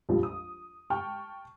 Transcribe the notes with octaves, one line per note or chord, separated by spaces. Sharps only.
A#1 F2 F3 G3
D#6
G5 A5 C#6 F6